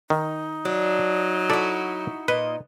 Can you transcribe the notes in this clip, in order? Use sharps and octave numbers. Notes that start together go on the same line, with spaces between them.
D#3 D#4
F#3 D4
E4 F#4 A4 D5
A#2 B4 D#5